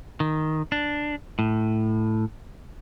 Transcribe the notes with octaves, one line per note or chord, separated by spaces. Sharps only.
D#3
D4
A2